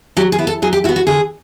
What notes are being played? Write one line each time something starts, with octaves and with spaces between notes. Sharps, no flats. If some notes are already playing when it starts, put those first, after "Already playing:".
F#3 G4
G#4
B3 E4
A4
F#3 G#4
G4
E4 F#4
B3
F#4
D3 G#4